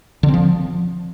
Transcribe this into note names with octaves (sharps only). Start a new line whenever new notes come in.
D3
C4
F3